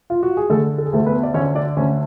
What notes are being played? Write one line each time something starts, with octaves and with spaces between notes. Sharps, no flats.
F4
F#4
G#4
D3 A3 A4
A4
G#4
D2 A3 A4
B3 B4
D5
D3 C#4 C#5
D4 D5
D2 C#4 C#5